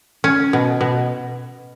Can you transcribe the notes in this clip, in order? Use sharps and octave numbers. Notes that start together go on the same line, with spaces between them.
C#4
B2
B2